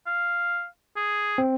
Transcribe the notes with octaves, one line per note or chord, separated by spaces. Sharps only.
F5
G#4
C4